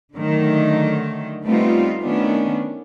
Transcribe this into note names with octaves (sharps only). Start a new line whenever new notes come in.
D3 D#3 F#3 A3
G3 A3 B3 C4 D#4 F4
D#3 A3 B3 C#4 D4